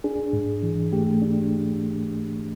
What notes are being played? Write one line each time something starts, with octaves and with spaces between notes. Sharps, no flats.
D4 G#4
G#2
E3
A3 G4
D4